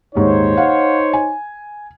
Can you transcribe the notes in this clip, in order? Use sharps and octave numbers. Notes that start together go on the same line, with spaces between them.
D#1 G#2 D#4 C5 C#5
F5 F#5
G#5